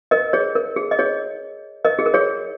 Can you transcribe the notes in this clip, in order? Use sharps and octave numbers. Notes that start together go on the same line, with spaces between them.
A#4 D#5
G#4 C#5
A#4
G#4
D#5
G#4 C#5
A#4 D#5
G#4
A#4
G#4 C#5